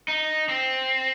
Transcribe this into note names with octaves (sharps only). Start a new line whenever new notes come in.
D#4
C4